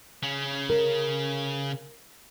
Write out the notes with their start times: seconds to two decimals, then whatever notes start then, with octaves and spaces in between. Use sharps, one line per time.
0.23 C#3 C#4
0.70 A#4